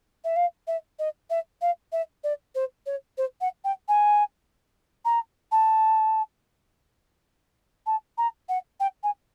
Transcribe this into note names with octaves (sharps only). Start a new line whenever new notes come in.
E5
F5
E5
D#5
E5
F5
E5
D5
C5
C#5
C5
F#5
G5
G#5
A#5
A5
A5
A#5
F#5
G5
G#5